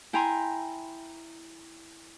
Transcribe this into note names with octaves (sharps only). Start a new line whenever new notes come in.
E4 G5 G#5 A#5 C6